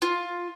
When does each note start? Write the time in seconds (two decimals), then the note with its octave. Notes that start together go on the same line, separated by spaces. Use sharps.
0.02 F4